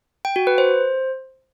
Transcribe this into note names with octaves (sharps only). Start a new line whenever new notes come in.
G5
F#4
B4
C5